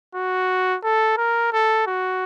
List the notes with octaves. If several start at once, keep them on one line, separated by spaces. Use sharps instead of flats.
F#4
A4
A#4
A4
F#4